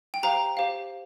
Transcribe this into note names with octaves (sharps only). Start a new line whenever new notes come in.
G5
G4 C5 F5 A#5
G4 C5 F5